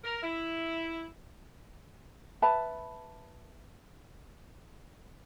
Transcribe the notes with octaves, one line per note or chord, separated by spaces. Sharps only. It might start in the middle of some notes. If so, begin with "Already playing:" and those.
A#4
E4
B4 E5 A5 B5